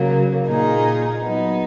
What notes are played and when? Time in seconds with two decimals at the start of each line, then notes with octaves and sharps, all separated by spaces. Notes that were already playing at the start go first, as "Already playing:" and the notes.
Already playing: C#3 F#3 A#3
0.47 A#2 A#3 D#4 G#4
1.22 F#3 B3 D#4